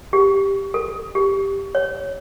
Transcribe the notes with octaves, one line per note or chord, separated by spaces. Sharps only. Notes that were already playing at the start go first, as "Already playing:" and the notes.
G4
A4
G4
C#5